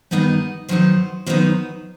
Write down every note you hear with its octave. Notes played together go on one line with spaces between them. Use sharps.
D#3 G3 B3 D#4 D#5
D#3 F#3 B3 D#4 C5
D#3 F#3 B3 D#4 C5